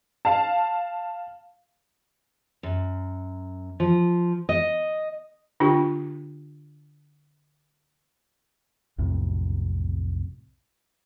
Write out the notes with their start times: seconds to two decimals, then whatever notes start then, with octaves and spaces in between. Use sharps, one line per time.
0.25 F5 A5
2.63 F#2
3.80 F3
4.49 D#5
5.60 D3 D4 F4 G4 G5 C#6
8.98 B1 F2 A2 C3